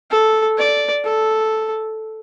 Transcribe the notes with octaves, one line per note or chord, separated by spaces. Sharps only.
A4
D5
A4